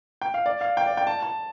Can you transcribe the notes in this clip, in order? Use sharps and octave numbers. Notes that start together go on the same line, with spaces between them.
G5
F5
D5
F5
G5
D5
G5
A5
A5